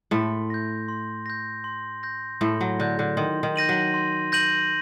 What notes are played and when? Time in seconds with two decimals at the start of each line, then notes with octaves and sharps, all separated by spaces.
0.11 A2 A3 C6
0.50 G6 A#6
0.88 C6
1.26 G6 A#6
1.64 C6
2.03 G6 A#6
2.41 A2 A3 C6
2.61 F#3
2.79 D3 G6 A#6
2.99 D3
3.17 D#3 C6
3.43 D#3
3.56 G6 A#6 D#7 F#7
3.69 F#3
3.94 C6
4.32 G6 A#6 D#7 F#7